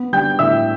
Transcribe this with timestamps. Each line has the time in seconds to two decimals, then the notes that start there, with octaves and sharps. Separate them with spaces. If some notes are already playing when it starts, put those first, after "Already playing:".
Already playing: B3
0.13 G3 G5 G6
0.39 A2 E5 E6